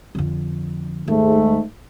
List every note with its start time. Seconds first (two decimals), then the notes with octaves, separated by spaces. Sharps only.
0.15 F2 D3
1.08 D#2 G#2 A3